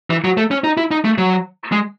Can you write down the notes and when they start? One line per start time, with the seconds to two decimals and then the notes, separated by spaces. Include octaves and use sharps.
0.10 E3
0.24 F#3
0.37 A3
0.51 C#4
0.64 D#4
0.77 E4
0.91 D#4
1.05 A3
1.18 F#3
1.72 G#3